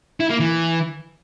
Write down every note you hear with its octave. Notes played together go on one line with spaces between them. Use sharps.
E4
A#3
E3